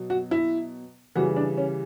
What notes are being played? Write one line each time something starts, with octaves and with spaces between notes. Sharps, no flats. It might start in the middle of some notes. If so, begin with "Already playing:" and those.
Already playing: B2 F#3
F#4
E4
C#3 E3 G3 F#4
D4
C#4